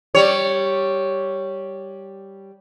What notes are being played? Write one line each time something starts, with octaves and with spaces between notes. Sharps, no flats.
G3 C#5